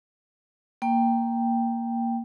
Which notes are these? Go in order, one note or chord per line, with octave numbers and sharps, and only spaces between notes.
A#3 G5